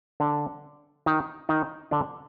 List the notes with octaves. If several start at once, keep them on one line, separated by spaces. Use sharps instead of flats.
D3 D4
D#3 D#4
D#3 D#4
D3 D4